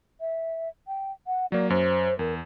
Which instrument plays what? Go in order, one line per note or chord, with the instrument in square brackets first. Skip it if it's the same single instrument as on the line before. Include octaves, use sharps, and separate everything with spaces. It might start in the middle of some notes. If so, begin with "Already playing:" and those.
[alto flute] E5
G5
F#5
[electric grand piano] F#3 A#3 [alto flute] D5
[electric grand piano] F#2 [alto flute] C5
[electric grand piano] E2 [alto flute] A#4